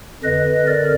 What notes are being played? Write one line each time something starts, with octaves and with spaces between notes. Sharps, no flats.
F2 D3 B4 D#5
A#4 D5